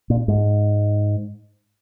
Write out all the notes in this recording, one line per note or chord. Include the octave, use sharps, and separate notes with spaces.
A#2
G#2